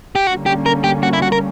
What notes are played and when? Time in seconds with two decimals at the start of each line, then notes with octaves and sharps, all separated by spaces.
0.15 G4
0.27 D3 G3 A#3 C#4 F#4
0.46 G4
0.66 A#4
0.84 G4
1.03 F#4
1.13 E4
1.22 F#4
1.32 A#4